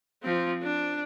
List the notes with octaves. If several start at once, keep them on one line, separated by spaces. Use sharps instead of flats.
F3 C4
D4